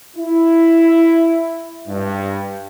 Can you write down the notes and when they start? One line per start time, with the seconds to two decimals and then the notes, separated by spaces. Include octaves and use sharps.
0.17 E4
1.87 G2